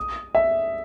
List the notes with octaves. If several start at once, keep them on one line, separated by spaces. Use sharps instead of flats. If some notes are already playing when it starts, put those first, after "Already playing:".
Already playing: D#6
E5